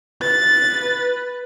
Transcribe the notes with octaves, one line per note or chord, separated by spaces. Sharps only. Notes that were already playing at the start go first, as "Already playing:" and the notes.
B4 A6